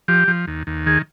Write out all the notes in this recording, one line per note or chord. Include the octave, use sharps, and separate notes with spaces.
F3 G4
F3
D#2
D#2
D#3 G#4